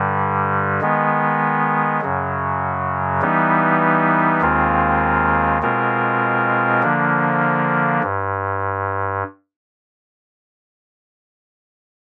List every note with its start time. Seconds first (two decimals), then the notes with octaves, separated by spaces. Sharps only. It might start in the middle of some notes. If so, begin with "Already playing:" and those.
Already playing: G2 D3 G3
0.81 D#3 G#3 B3
2.01 F#2 C#3 F#3
3.21 E3 G3 B3 D#4
4.41 D#2 D#3 G#3 C4 F4
5.62 B2 G#3 C4 F4 A#4
6.82 D3 F3 A#3 D4
8.03 G2